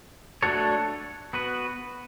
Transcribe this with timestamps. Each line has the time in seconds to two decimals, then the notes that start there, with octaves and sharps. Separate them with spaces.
0.42 A3 D4 F#4 A4 C#5
1.33 B3 F#4 B4